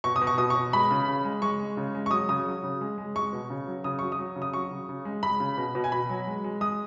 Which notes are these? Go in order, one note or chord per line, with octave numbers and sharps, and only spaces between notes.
B2 C#6
D#6
B2
C#6
B2 D#6
C#6
B2
G#3 B5
C#3
C#3
G#3
G#3 C#6
G#3
C#3
G#3
C#6
F#3 D#6
C#3 D#6
F#3
C#3
G#3
G#3
G#3 C#6
B2
C#3
F#3
C#3 D#6
F#3 C#6
D#6
F#3
C#3
D#6
F#3 C#6
C#3
C#3
G#3
G#3 B5
C#3
B2
B2
G#5
B2 B5
F#3
G#3
G#3
G#3 D#6